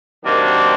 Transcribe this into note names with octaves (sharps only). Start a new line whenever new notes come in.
C3 D#3 F#3 A#3 D4